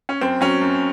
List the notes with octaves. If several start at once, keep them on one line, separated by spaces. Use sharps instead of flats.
C#4
F#2 C4
F#3 C#4
F#2